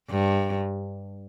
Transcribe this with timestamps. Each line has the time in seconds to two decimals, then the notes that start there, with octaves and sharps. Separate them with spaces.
0.10 G2